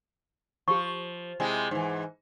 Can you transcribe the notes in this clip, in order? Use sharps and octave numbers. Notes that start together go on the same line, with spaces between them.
F3 G4 C#6
C3 G#3 E4
G#2 E3